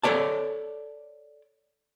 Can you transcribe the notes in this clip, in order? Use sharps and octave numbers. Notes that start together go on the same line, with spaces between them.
A4 A#4 C#5 D5 A5